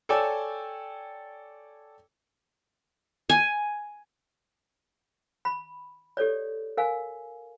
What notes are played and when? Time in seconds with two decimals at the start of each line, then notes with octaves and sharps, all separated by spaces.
0.09 A4 C#5 D5 G5 G#5 E6
3.30 G#5
5.45 B5
6.17 G4 A4 C#5 D5
6.77 A#4 F5 G#5